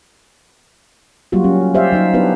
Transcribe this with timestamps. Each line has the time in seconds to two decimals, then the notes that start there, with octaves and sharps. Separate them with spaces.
1.32 F#3 G3 A#3 F4 F#4
1.44 C#4
1.74 G4 C5 D5 E5 F5
1.92 F#3 D#4 F5
2.14 B3 D4 E4 G4 B4 C5